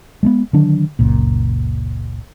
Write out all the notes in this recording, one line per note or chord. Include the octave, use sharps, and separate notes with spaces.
G#3 A3 B3
D3 D#3 F#3 D4
F#1 C#2 A#2